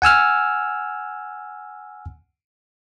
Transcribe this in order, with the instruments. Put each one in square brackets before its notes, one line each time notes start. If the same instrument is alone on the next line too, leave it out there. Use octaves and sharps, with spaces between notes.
[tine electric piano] F#5 G#5 E6 F6